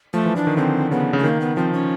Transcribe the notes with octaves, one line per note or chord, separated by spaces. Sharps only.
F3 A3
E3
F3 D4
D#3
D3 C4
C#3 B3
C#3
A3
D#3 A#3
B3
F3 C4
C#4